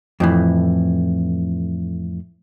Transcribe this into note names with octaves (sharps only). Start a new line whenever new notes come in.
F2 A2 E3